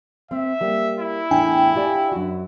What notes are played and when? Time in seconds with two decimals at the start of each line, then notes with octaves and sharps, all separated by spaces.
0.31 C4 E5
0.61 G3 A#3
0.99 E4
1.31 E2 A2 D4 G5 G#5
1.75 F4 G4 D5
2.12 F#2 F#4